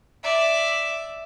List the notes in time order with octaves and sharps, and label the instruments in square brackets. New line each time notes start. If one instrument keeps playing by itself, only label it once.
[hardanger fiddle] D5 E5